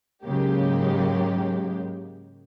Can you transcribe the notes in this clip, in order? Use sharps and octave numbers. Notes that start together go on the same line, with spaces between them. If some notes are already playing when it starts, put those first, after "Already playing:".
G#2 C#3 F#3 G#3 A#3 G4